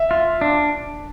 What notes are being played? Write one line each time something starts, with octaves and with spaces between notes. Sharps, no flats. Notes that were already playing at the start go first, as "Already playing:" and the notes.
Already playing: E5
F4
D4